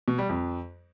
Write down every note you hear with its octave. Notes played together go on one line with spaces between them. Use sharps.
B2
G3
F2